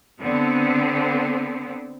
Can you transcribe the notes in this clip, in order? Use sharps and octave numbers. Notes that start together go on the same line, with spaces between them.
D3 B3 C4